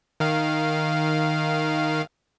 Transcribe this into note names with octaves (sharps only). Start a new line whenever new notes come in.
D#3 F5